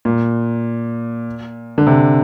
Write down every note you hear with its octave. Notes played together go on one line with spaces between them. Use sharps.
A#2
D3
C3